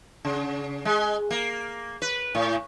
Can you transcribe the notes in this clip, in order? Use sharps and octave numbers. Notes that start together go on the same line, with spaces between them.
C#3
G#3
A#3
B4
A2